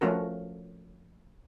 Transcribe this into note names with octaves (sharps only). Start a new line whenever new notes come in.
F3 A3 C#4 F#4 A#4